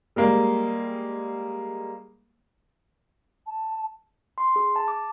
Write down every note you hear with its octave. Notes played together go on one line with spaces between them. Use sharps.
G3 G#3 A#3
A5
C6
G#4
A5
D6